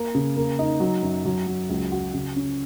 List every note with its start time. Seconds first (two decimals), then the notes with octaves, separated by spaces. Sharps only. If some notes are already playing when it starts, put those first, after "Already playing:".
Already playing: A#3
0.15 C#3
0.37 A#3
0.59 D#4
0.80 F#3
1.03 F#2
1.25 F#3
1.47 F#3
1.69 C#2
1.92 F#4
2.14 C#3
2.36 C#4